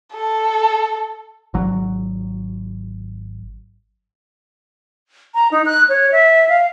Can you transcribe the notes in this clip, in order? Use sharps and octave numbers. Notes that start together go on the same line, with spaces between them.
A4
G#1 F#3
A#5
D#4
F#6
C#5
E5
F5